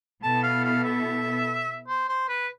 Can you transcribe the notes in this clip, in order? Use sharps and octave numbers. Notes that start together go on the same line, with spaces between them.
B2 B3 E4 A4 A5
F5
F5
E5
C5
C5
B4